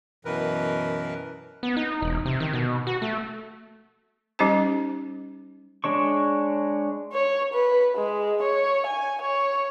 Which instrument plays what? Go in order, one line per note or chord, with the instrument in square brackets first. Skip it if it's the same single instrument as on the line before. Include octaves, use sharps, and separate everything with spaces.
[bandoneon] F#2 B2 E3 A#4 B4
[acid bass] B3
D#4
E1
C3
D#3
B2
F#4
A3
[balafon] G3 C#4 D#4 G4 C5 A5
[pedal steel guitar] G#3 D4 C#5 C#6
[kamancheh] C#5
B4
G#3
C#5
G#5
C#5